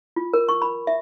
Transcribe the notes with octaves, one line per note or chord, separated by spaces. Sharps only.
F4
A#4
C#6
B5
E5